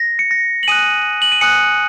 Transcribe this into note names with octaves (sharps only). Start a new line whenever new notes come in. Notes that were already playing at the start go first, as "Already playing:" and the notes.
Already playing: A#6
C#7
A#6
F#7
G#5 D#6 F#6 D#7
F#7
D#7
G#5 D#6 F#6 C#7